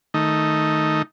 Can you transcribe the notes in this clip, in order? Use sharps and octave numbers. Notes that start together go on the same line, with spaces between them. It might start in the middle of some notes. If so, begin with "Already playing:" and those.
D#3 A3 D#4